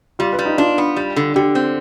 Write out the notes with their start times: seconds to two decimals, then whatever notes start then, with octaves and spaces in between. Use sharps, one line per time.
0.19 G3 F4
0.33 B4
0.39 G3
0.45 D#4
0.58 D4 F4
0.78 B3
0.96 G3
1.16 D3
1.36 D3 G4
1.55 C4